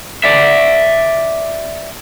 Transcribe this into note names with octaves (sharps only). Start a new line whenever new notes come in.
D5 E5